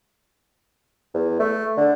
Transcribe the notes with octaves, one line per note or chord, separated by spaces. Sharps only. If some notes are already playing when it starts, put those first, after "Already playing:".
E2
A3
D3